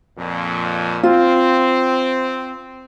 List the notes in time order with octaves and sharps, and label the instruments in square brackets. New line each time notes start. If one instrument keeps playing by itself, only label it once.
[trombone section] F2 A#2
[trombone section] C4 [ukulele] F4